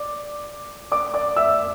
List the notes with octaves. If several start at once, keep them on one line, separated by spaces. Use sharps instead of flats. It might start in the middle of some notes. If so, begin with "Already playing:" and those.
Already playing: D5 D6
D5 D6
D5 D6
E5 E6